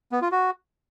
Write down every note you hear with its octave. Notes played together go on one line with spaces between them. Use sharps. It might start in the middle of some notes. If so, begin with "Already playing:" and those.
B3
F4
F#4